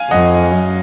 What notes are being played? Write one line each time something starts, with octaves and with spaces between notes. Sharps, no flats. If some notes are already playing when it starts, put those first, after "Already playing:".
Already playing: F5 G#5
F2 D#5 F#5
F#2